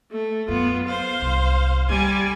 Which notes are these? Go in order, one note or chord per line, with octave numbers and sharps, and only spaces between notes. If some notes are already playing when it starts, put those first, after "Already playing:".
A3
F#2 B3 F4
C5 F5
C2 D4
D3 G3 G#5